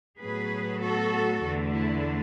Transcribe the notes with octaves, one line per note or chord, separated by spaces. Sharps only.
A2 F#3 B3 G#4 B4
F#4 A4
E2 D3 A3
E4